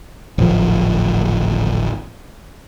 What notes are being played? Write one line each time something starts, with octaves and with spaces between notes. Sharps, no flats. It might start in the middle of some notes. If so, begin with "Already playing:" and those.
D1 G#1 F3